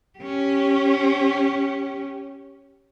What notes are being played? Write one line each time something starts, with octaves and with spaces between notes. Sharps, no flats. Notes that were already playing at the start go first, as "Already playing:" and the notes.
C#4 G4